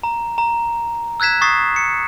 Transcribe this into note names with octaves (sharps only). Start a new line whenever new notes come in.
A#5
A#5
E6 F#6 G#6 B6 E7
C#6 D#6 A6 B6 C7
C#7